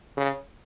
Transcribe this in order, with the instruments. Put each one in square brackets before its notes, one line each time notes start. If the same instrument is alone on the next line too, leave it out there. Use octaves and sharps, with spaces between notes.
[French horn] C#3